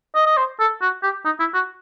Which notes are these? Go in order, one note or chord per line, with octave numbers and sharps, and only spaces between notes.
D#5
D#5
C5
A4
F#4
G4
D#4
E4
F#4